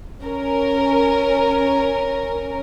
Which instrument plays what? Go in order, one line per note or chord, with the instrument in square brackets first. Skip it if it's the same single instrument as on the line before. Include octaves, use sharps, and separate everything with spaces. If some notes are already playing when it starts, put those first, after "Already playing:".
[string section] C#4 A#4